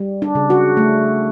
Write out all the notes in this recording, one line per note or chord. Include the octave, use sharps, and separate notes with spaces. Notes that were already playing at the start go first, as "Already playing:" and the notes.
Already playing: G3
D4
C#3
F#4
A3